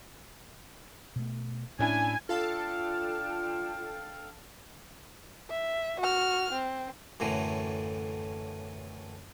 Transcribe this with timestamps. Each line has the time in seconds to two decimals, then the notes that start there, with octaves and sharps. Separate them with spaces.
1.16 B2 A3
1.79 A2 C#4 D4 E4 G#5
2.29 D4 F4 A4 F5 G5 A5 F6
5.50 E5
6.00 F#4 F6
6.52 C4
7.20 F#2 A2 D3 E3